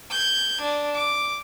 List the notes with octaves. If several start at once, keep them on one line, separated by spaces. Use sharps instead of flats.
G6 G#6
D4
D6